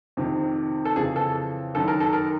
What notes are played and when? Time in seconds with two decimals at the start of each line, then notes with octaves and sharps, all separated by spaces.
0.17 F2 C3 D#3
0.85 A4
0.96 F2 C#3 E3 G#4
1.16 A4
1.75 F#2 D#3 A4
1.88 A#4
2.00 A4
2.13 A#4